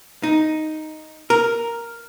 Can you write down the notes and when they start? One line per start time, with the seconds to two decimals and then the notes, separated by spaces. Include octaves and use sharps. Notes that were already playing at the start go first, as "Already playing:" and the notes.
0.23 D#4
1.30 A#4